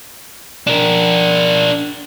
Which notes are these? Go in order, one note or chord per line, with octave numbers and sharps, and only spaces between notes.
D4 A#4